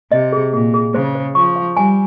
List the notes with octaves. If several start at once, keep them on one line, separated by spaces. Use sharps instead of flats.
C3 D#5
G#4
A#2 G#4
G#4
C#3 C5
C5
F3 C#6
F5
G3 G#5